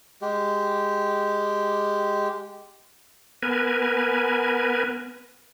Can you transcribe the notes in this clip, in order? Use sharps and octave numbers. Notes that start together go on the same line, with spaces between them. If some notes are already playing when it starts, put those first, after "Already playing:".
G#3 G4
B3 A#4 B4 G#5